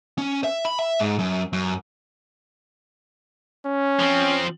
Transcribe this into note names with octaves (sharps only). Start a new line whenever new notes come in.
C#4
E5
B5
E5
G#2
F#2
F#2
C#4
F3 C4